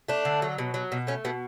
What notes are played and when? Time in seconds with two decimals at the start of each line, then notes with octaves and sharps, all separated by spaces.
0.09 A3 D4
0.25 D3
0.42 F#3
0.58 B2
0.74 F#3
0.92 B2
1.07 A3 C#4
1.25 B2 B3